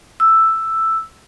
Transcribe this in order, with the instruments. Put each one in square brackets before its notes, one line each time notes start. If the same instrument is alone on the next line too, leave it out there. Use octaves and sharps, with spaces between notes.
[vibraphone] E6